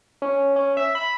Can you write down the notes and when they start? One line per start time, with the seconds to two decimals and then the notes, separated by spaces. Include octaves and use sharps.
0.22 C#4
0.56 C#4
0.77 E5
0.95 B5